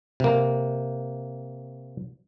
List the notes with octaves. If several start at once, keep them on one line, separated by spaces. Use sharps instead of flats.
C3 A#3